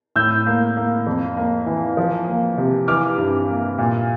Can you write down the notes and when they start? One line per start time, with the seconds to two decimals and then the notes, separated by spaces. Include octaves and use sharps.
0.16 A2 E6 G6
0.47 A#3
0.77 A#3
1.06 F2
1.37 A#3
1.66 E3
1.97 F3
2.28 A#3
2.58 C3
2.88 E3 D6 F6
3.17 G2
3.48 A#3
3.78 A#2